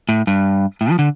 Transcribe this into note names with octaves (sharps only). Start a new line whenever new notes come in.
A2
G2
A2
F3
D3